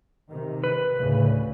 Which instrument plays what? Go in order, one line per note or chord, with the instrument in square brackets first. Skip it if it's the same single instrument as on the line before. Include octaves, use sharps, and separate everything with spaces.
[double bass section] C3 D#3
[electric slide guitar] B4
[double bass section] D2 A2 C#3